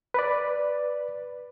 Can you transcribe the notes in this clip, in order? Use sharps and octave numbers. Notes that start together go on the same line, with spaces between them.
B4 D5